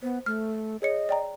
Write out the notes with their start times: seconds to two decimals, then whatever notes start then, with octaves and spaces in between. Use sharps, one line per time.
0.03 B3 C5
0.26 A3 F6
0.82 G#4 C#5 D#5 C#7
1.09 D5 G5 A#5